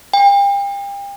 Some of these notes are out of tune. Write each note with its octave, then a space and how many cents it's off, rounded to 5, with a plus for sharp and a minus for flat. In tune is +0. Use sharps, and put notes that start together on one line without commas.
G5 +35